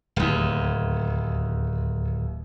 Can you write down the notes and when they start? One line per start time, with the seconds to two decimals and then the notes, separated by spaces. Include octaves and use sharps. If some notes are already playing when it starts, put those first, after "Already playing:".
0.16 D1 D#2